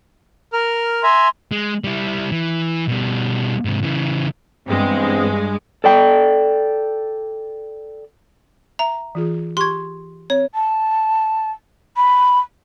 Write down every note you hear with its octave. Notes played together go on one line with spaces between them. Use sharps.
A#4 F6
E5 G#5 A#5 C6
G#3
G3 E4
E3
B2 G3
G#2 C3
C#3 E3
G2 E3 G#3 B3 C4
A4 D5 G5
E5 A#5
E3 F4 G#4
G4 C6 C#6 G#6
C4 C#5
A5
B5